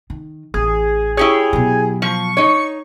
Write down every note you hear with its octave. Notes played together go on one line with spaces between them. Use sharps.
D#3
A1 G#4
E4 G4 G#4 C#5
B2 F#3
F3 C#6
D#4 C#5